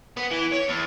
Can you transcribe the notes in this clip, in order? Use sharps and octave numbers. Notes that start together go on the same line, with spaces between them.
B3
E3
C#5
E2